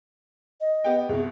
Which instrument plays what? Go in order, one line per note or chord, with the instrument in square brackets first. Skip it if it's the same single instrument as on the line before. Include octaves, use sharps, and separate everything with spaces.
[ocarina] D#5
[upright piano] B3 G4 G5
[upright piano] C2 B2 [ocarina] G#4